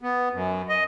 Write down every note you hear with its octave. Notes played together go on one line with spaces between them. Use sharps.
B3
F#2
D#5